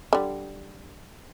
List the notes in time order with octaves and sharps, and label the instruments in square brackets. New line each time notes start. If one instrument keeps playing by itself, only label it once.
[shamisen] D3 G3